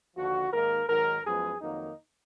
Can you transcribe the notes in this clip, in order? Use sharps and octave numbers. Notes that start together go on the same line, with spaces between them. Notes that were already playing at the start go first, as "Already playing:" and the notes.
D#2 D3 F3 F#4
G#2 D#3 A#3 A#4
G#2 D#3 F#3 A#4
F#2 F3 G#3 B3 G#4
F2 D#3 F#3 A#3 D#4